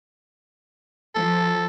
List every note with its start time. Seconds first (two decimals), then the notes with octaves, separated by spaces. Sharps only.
1.15 F3 A4